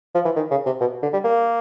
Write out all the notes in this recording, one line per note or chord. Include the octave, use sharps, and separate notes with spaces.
F3
E3
D#3
C#3
C3
B2
D3
G3
A#3